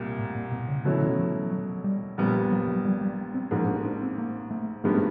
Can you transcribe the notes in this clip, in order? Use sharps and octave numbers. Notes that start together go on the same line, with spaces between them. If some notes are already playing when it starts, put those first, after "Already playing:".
Already playing: C2 A#2 G3
A2
A#2
B2
C#3
B2 D3 F#3 A3 C#4 E4
D3
D#3
F3
F#3
F#3
G3
A#1 A#2 G3 B3
F#3
F#3
G3
G3
C4
A1 G#2 F3 A#3
D4
D4
C4
A#3
A3
G#1 G2 D#3 G#3 A3 B3